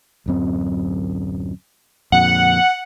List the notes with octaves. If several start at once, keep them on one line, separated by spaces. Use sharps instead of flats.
D1 F#2 C4
F2 A#2 D3 F#5